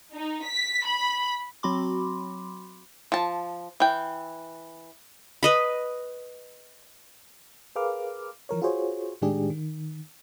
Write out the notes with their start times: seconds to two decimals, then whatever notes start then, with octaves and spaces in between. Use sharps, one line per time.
0.13 D#4
0.45 B6
0.85 B5
1.63 F#3 C4 F#4 B5 C6 D6
3.12 F3 A5
3.80 E3 G5
5.43 B4 D#5 B5
7.76 G#4 A#4 B4 F5 D6 F6
8.49 E3 F3 A#4 C#5
8.62 F4 F#4 G#4 C5 C#5
9.22 A2 D#3 G#3 D4 G4 G#4
9.50 D#3